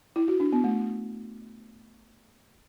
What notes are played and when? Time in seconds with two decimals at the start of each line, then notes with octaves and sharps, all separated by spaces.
0.16 E4
0.28 F#4
0.40 D4
0.53 B3
0.64 A3